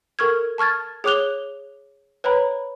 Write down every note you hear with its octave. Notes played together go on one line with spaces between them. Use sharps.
A4 A#4 C#6 F6 G#6
A5 C#6 F6 G#6 A6
G#4 C#5 D6 F#6 F7 G7
B4 C#5 A#5 B5